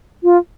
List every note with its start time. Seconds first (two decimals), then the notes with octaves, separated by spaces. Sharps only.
0.24 F4